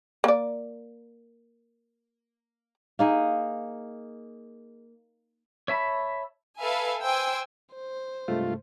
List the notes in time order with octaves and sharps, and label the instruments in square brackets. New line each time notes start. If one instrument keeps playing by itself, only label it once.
[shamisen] A#3 D5
[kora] A#3 D#4 G#4
[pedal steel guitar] C#5 E5 A5 B5
[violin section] A4 B4 E5 F5 G#5
C5 G5 G#5 E6
[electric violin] C5
[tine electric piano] G2 C3 G#3 [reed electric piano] A3 [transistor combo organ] F4